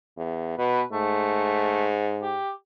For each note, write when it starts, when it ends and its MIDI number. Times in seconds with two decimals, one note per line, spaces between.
0.18 0.56 40
0.58 0.82 47
0.58 0.83 71
0.92 2.41 44
0.92 1.86 57
2.23 2.51 67